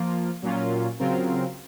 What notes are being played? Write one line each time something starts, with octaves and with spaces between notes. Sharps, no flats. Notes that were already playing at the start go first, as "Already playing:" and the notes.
Already playing: F3 A#3 F4
A#2 F#3 A#3 C#4 F4
C#3 F#3 C4 F4 A#4